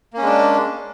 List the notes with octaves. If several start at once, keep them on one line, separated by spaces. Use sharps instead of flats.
G#3 A#3 C#4 D4